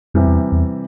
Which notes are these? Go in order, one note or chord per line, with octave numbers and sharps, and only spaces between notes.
F2 C3 E3 G3
E2
E2